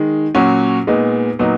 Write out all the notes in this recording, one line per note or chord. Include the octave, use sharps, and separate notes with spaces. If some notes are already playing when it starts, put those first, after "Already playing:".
Already playing: D#3 G#3
A#2 F#3 C#4 F#4
A#2 G#3 B3 D#4
A#2 F#3 B3 D#4